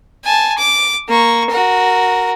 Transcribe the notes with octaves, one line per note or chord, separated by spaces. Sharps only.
G#5 A5
D6
A#3 C#6
F#4 A#4